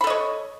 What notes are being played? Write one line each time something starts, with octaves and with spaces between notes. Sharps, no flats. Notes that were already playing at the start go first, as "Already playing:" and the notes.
A4 C#5 D#5 B5